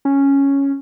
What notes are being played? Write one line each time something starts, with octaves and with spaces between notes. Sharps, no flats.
C#4